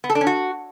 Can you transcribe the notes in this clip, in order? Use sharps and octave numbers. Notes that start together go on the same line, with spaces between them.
B3
A4
D4
C#4
F#4